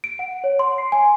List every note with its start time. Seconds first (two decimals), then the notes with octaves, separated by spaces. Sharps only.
0.04 D7
0.19 F#5
0.44 C#5
0.59 C6
0.78 C7
0.92 G#5